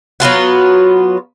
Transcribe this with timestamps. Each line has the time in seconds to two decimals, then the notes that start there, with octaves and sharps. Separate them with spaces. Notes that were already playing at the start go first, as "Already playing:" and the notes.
0.20 F#3 B3 F4 F#4